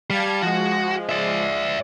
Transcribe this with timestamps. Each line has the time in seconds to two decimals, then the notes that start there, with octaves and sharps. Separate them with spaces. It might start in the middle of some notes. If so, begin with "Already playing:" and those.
0.10 G3 F5 A5 G#6
0.42 F3 G#3 F#4
1.09 D5 E5